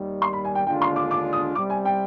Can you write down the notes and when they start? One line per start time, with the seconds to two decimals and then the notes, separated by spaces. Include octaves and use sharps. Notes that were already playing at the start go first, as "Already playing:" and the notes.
Already playing: D#2 D#3 G3
0.22 C6
0.33 B5
0.45 G#5
0.55 G5
0.67 D#2 D3 G#3 D4 F4 G5
0.82 C6
0.96 D6
1.11 D6
1.33 D#6
1.55 C2 C3 G3 D6
1.70 G#5
1.85 G5